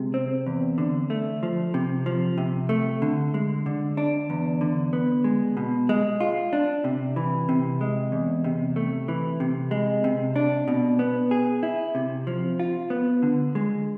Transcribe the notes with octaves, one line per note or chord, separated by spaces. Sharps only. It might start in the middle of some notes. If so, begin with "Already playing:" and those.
Already playing: C3 G#3
C4
E2
D3
A3
F3
C3
F3
C3
A3
D3
G#3
D3
D4
E2
D3
B3
G#3
B2
G#3
F4
D4
C3
E3
C3
G#3
E2
C3
A3
E3
C3
G#3
C3
D4
B2
B3
G#4
E4
C3
F3
F4
B3
D3
G#3